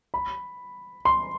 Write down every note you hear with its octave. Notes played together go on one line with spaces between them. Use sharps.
B5
C6